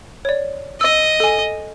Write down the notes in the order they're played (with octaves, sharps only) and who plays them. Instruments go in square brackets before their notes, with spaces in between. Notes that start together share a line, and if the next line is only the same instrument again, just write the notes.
[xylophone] C#5 D5
[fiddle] D#5 [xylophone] E6
[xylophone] A4 G#5